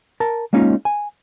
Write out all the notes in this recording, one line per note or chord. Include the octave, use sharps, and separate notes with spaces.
A#4 A5
G#3 A#3 C#4 D#4 F4
G#5